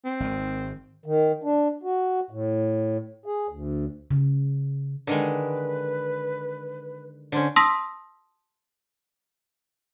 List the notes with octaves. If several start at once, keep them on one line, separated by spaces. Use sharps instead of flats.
C4
G#1 D#3
D#3
D4
F#4
A2
G#4
D2
C#3
D3 D#3 G#3 B4
D3 C#4 C5
A5 C6 D#6 E6 A#6 B6